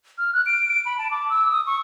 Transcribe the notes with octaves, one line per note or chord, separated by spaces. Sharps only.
F6
F#6
D7
D7
B5
A5
D6
E6
D#6
C#6